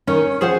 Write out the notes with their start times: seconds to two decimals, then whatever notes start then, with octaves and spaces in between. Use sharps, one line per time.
0.07 D#3 C#4
0.41 F3 G#4 C5 F#5